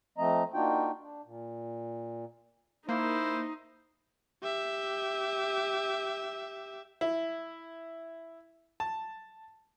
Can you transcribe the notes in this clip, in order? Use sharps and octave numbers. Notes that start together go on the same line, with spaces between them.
F3 A3 C4 D#5 A#5
A#3 D4 D#4 F4 F#4 G5
D4
A#2
A#3 D#4 E4 C5
G4 E5
E4
A5